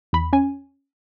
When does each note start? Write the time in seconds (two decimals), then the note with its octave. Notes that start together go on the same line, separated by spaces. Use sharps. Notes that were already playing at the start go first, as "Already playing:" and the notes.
0.13 E2 B5
0.33 C#4 G#5